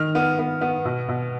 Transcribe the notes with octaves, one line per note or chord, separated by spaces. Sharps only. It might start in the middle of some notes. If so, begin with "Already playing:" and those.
Already playing: D#3 F6
B3
B3
B3
B2
B2